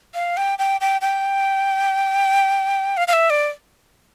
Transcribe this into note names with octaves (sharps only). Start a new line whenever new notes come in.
F5
G5
G5
G5
G5
F5
F5
E5
D5